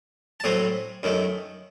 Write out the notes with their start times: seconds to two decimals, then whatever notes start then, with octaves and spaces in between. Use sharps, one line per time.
0.40 A5
0.44 A2 F#3 A3 C4 G#5
1.03 F#2 D#3 A3